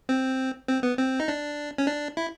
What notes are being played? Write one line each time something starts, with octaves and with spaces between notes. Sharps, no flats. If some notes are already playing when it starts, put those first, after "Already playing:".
C4
C4
B3
C4
D#4
D4
C#4
D4
E4